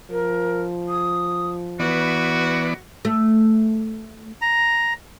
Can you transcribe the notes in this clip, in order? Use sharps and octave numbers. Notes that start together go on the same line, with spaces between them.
F3 A#4
D#6
E3 B3 F#4 B4 D5
A3
A#5